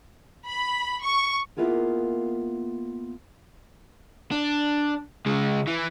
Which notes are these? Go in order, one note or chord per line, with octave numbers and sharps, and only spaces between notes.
B5
C#6
A#3 B3 E4 F4 G#4 A#4
D4
C#3 G#3
E3